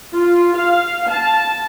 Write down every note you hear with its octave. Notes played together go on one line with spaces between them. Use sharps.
F4
F5
A5